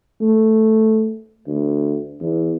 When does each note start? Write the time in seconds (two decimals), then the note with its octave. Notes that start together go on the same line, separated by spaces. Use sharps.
0.21 A3
1.47 D2
2.21 E2